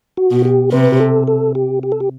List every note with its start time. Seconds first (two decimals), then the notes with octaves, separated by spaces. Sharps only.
0.17 F#4
0.31 B2
0.45 G4
0.72 C3 B4
0.92 G4
1.00 A4
1.28 A4
1.55 G4
1.83 G4
1.92 A4
2.00 G4